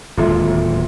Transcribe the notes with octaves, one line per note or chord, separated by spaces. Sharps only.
D1 D#2 G#3 F4 A4 E5